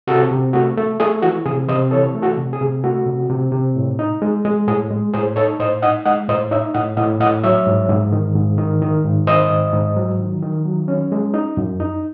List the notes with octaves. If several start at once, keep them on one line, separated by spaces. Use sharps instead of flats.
C3 F#4 A4
C3
A3 F#4
A3
A3 G#4
E3 F#4
C3 G#4
C3 C5 D#5
E3 A4 C#5
A3
F#4 A4
C3
G#4
C3
A3 F#4
C3
C3
C3
A2
D#4
G#3
G#3
A2 G#4
G#3
A2 G#4 C5
D#4 A4 C#5
A2 C5 D#5
D#4 D#5 F#5
G#3 D#5 F#5
A2 C5 D#5
D#4 C#5 E5
A2 D#5 F#5
A2 D#5 F#5
A2 D#5 F#5
F#3 C#5 E5
G#2
G#2
D#3
G#2
D#3
D#3
G#2
D#3 C5 D#5
G#2
G#2
F#3
D#3
D#3
F#3
C#4
G#3
D#4
F#2
D#4